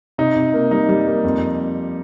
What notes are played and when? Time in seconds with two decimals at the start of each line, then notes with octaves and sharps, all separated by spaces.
0.18 C3 D#4
0.36 C3
0.54 A#3
0.71 G3 D#4
0.89 G3
1.07 A#3
1.24 F2